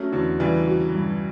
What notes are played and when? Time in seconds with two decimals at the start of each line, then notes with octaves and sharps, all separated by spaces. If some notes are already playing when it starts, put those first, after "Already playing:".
Already playing: F#3 A3 C#4
0.12 E2 D3 F#3
0.40 C#3 E3 G3
0.68 F#4
0.94 G2